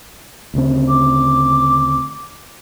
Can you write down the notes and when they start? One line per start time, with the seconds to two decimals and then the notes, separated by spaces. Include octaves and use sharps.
0.54 D2 C#3 C4
0.88 D6